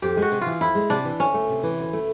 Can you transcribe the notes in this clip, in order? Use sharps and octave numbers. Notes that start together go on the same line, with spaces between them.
F2 G4
G#3
F#4
C3
E3 F4
F2 E4
G#3
C3 D4
E3
D2 C#4
A3
C3
E3
D2
A3